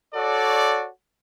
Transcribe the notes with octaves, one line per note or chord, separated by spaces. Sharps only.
F#4 A4 C#5 D5